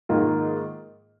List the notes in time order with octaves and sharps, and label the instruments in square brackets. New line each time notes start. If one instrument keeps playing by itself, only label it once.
[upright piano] G#2 D#3 A#3 F4